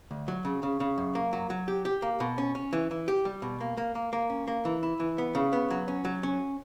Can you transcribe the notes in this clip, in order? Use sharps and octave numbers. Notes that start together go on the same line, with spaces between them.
D2
F#3
C#3
C#3
C#3
F#2
A#3
F#3
F#3
G4
G4
A#3
B2
C#4
C#4
E3
E3
G4
G3
B2
A#3
A#3
A#3
A#3
C#4
A#3
E3
E4
E3
B3
C#3
B3
F#3
C#4
F#3
C#4